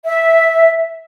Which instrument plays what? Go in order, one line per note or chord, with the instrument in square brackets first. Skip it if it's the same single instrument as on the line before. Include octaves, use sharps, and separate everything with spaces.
[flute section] E5